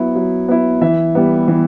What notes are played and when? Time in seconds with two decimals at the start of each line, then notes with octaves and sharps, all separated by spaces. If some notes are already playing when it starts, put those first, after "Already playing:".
Already playing: F#3 B3 E4
0.15 F#3
0.48 B3 E4
0.82 E3 E5
1.15 G3 B3
1.48 E3